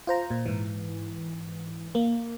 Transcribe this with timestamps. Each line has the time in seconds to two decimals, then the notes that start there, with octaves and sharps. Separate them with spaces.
0.07 F4 C5 A#5
0.31 A#2
0.46 G#2 E3
1.95 A#3